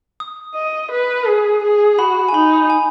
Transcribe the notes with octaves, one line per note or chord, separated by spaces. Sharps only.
D#6
D#5
B4
G#4
G#4
F#4 B5
G#5
D#4 B5
G#5